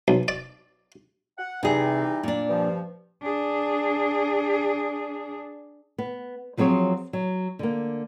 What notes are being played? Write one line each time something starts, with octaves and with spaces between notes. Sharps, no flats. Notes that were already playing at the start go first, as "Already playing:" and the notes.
B1
D5
F#5
C3 E3 G3 D#4 G#4
A#2 D4
G2 F3
D4 G#4
B3
F3 F#3 C4 G#4 C#5
F#3
D3 A#3